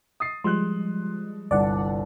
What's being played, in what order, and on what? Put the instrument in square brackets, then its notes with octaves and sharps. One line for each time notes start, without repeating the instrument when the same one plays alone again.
[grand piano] D#6 A6 C7
[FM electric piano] F3 G3 G#3 [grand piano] C6 F#6
[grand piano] G1 C2 A5 [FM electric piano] D5 F#5